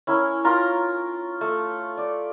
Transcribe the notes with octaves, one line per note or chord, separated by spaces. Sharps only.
C#4 E4 A#4
F4 A#4 A#5
A3
D5